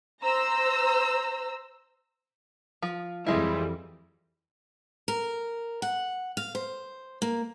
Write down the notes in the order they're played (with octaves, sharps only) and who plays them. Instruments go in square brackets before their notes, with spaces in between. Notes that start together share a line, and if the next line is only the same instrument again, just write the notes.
[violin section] C5 A#5 E6
[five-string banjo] F3
[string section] F2 E3 G3 [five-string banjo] G#3 E4
[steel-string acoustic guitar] A#4
F#5
F5
C5
A#3